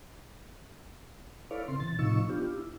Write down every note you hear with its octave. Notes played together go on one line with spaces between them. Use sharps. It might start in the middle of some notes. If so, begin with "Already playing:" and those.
E4 A4 B4 C#5 D5 F5
C#3 C4 C6
B2 E3 A6
A2 C3 F3 D#4 C#6 E6
B3 D4 F4 G4
E4